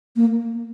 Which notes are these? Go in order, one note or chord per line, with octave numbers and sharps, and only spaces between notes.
A#3